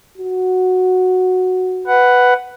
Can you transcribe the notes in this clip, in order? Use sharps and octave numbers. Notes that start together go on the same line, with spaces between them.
F#4
B4 F#5